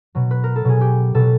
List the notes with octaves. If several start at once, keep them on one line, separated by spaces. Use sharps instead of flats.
B2 F#3
B4
A#4
A4
B2 F#3 G#4
G4
B2 F#3 A4